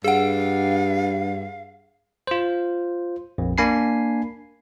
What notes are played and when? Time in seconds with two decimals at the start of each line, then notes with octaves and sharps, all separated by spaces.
0.04 G2 G#4 F5 F#5
2.27 F4 C5
3.38 A#1 F2
3.58 A#3 D4 G#5 B5 C7